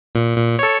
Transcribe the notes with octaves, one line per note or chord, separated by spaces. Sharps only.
A#2
A#2
A4 C#5